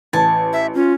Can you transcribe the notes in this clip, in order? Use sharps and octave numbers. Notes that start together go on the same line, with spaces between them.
A1 G#5 A5
E5
C#4 F4